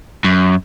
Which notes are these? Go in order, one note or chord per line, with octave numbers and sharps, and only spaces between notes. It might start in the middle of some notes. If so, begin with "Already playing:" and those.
F#2